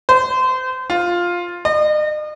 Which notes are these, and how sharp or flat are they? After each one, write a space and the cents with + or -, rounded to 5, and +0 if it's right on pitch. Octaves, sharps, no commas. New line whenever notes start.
C5 -30
F4 +5
D#5 -40